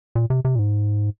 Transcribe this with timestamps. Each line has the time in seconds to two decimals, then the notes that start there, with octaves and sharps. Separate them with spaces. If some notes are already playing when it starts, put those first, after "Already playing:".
0.15 A#2
0.30 C3
0.45 C3
0.55 A#2
0.59 G#2